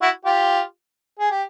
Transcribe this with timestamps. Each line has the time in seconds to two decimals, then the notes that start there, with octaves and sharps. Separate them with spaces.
0.02 E4 F#4
0.25 F4 G4
1.19 G#4
1.31 G4